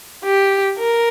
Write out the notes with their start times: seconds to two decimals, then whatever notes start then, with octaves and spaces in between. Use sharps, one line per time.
0.24 G4
0.78 A#4